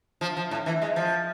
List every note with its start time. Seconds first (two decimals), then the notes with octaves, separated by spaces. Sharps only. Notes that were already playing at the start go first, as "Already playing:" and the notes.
0.21 F3
0.37 F3
0.51 A2
0.66 E3
0.82 G#3
0.96 F3